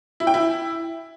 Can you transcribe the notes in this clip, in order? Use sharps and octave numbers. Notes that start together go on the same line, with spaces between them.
E4
G5
E4